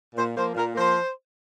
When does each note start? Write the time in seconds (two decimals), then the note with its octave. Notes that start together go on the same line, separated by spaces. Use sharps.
0.15 A#2 C5
0.35 F3 A#3 C5
0.55 A#2 A#4
0.75 F3 A#3 C5